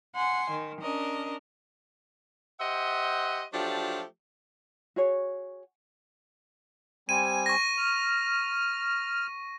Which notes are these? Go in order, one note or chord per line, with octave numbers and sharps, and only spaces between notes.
F#5 G#5 C6
D#3
C#4 D4 A#4 D#5
G4 C5 D#5 E5 F#5
F3 F#3 A3 D4 F4 G4
F#4 G#4 C#5
G3 C4 G#5 D#7
C#6 A#6
F6